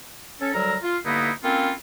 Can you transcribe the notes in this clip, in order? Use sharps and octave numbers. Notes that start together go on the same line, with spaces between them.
C#4 A4
D2 F#3 G3 A#4 A#5 E6
F4
G2 D3 A#3 B3 D#4 E4
A#3 C4 C#4 E4 F4 A4